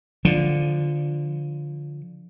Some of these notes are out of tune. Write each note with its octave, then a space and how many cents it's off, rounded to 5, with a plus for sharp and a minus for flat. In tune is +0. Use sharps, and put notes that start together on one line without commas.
D3 +0 F3 +0